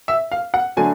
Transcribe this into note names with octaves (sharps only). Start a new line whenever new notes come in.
E5
F5
F#5
D3 F#3 A3 D4 G#5